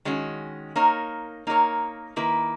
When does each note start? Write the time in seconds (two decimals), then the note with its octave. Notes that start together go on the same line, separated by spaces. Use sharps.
0.05 D#3 G#3 C#4 F#4
0.76 A#3 D#4 A#4 C#5
1.47 A#3 D#4 A#4 C#5
2.16 D#3 A#3 E4 B4